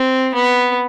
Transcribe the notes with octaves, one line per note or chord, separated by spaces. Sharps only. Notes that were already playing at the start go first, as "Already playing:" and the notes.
Already playing: C4
B3